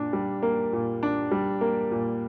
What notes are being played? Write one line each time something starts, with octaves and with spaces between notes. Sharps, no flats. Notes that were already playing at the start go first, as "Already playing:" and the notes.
Already playing: A#2 D4
G3
A#3
A#2
D4
G3
A#3
A#2